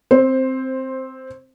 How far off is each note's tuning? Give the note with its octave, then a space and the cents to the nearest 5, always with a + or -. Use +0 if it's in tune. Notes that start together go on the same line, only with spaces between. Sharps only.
C4 +0 C5 +10